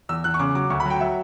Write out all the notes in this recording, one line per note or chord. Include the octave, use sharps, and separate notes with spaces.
E2 E6
E2 F#6
C#6
C#3 D6
F#3 D6
D2 C#6
B5
F#3 G5
F#3 E5